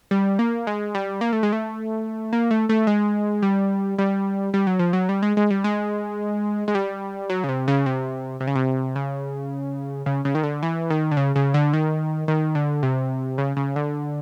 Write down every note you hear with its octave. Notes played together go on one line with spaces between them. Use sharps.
G3
A#3
G#3
G3
A#3
A3
G#3
A3
A#3
A3
A3
G#3
G3
G3
G3
F#3
F3
F#3
G3
G#3
G#3
G3
G#3
G#3
G3
F#3
C#3
C3
C#3
C3
C3
C#3
C3
C#3
C#3
C#3
D#3
D3
E3
D#3
D3
C#3
C#3
D3
D#3
D#3
D3
C3
C#3
C#3
D3